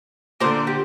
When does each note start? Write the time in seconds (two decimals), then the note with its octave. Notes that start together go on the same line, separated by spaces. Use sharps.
0.40 A#2 D3 A#4 C5 D5
0.67 G4